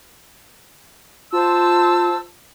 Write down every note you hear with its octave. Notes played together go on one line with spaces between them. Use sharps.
F4 C5 A5 E6